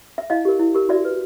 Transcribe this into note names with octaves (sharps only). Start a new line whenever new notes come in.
E5
E4 D#5 F5
G4 A#4
E4
G4 A#4
F#4 D5 E5
B4